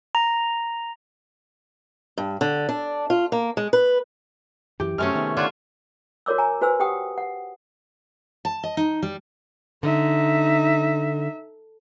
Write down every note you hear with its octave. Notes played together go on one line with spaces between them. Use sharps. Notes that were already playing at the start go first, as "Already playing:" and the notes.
A#5
G2
D3
D4
F4
A#3
G#3
B4
F#2 E3 G4
F#2 C3 F#3 A3 C#4 G#4 F6
D#3 B3
D3 F4 C#5 D5 E5 F#5
F#4 A#4 C#5 D6 E6
G#5 A#5
F#4 B4 C5 G#5 E6
G4 F#5 G5 D#6
F#5
A5
D#5
D#4
G3
D3 D#4 E5